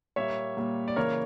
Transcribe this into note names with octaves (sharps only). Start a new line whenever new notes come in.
A#2 G3 A#3 C#5 E5
A#2 G3 A#3
D5
C#3 E3 A#3 A#4 C#5